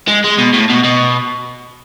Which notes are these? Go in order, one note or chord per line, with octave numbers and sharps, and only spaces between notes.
G#3
G#3
B2
A2
B2
B2